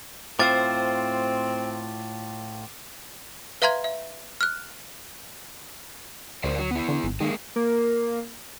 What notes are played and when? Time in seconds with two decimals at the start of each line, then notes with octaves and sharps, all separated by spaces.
0.39 A2 C4 F4 C5 D6 A6
3.62 B4 E5 F5 A#5 C6 G#6
3.84 E5
4.41 F6 F#6
6.44 D2 A#4 C5 D5
6.58 F#3
6.71 B3 E4
6.89 D3
7.04 G#1
7.20 D#3 G#3 A#3
7.56 A#3